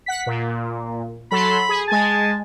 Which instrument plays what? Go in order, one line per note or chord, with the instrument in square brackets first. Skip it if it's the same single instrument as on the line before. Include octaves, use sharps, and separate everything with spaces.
[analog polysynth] F#5 B6
A#2
[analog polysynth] F#3 A4 C6 [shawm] B5
[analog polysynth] G#4
[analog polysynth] G#3 G#5 [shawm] A5